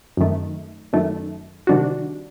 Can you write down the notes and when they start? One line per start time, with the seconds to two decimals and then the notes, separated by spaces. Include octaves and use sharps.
0.17 F#2 D#3 A3
0.93 F#2 D#3 A3
1.67 C3 D#3 G3 D4 F#4